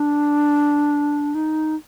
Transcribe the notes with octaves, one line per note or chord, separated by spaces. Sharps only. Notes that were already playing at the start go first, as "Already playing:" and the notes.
Already playing: D4
D#4